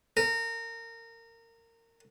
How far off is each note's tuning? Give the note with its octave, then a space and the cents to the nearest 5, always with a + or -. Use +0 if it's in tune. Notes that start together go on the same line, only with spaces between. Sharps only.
A#4 -25